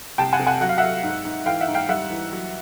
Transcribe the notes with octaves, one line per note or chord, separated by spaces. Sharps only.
C2 G5 A5
F#5 G#5
C3
F#5 G#5
F#3 F#5
F5
F#3 E5 F#5
G#2
G#2
E3 F5 G5
E5 F#5
G#2
F5 G5
G3 E5 F#5
E3
F#3